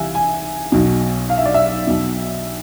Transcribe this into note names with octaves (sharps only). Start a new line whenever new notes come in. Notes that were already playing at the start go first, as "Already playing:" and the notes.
Already playing: C2 C3 E3 E5 F5 G#5
G#5
B1 B2
F5
E5
D5
E5
B1 B2